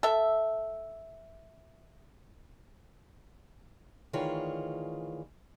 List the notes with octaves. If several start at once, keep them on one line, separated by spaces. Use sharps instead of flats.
A4 E5
D2 D#3 E3 F4 G#4 C#5